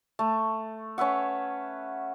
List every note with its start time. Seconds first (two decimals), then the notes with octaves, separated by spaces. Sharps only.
0.19 A3
0.98 C#4 B4 E5 F#5